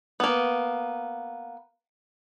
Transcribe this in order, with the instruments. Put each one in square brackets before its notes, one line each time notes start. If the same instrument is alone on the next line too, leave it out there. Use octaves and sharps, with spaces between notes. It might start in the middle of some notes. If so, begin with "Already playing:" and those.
[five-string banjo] A#3 B3